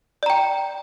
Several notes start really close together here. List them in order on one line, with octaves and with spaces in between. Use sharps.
D5 A#5 G5